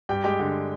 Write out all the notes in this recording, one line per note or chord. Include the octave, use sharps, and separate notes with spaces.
G2 G4 G5
G#3 G4 G5
D3